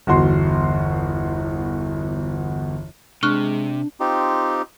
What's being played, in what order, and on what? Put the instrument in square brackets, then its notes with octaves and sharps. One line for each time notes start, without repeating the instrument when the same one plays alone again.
[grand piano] G1 E2 F#4 C6
[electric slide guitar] C3 [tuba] G#3 [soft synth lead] D4 [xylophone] C#6 F6 F#6
[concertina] C4 D#4 F4 G4